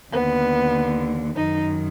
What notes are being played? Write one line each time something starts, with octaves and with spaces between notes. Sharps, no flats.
D#2 D3 B3
F#2 D#3 D#4